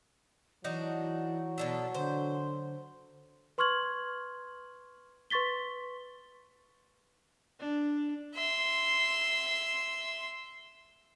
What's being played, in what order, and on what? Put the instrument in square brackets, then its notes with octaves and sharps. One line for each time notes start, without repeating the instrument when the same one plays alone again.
[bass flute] E3 [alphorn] F#3 [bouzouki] D4 D#4 F#4
[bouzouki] B2 D4 A4
[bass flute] D3 [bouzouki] C5
[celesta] B4 C6 C#6 F6 G#6 F#7
B4 C6 C#6 A6 B6 G7
[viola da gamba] D4
[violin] E5 C6